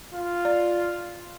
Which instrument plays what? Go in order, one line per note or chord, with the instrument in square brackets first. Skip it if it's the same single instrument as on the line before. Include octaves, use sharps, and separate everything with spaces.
[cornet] F4
[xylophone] D5